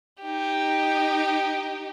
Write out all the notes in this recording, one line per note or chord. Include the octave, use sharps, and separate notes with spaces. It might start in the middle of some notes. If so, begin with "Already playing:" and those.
D#4 G4